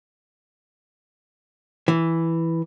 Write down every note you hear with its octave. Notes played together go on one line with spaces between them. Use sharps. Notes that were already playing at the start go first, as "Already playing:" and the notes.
E3